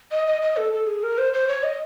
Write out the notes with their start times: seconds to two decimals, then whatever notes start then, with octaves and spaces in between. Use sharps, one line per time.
0.12 D#5
0.27 D#5
0.42 D#5
0.57 A4
0.73 A4
0.87 G#4
1.03 A#4
1.18 C5
1.33 C5
1.48 C#5
1.63 D#5